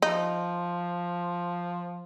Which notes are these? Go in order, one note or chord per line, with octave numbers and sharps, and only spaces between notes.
F3 D#4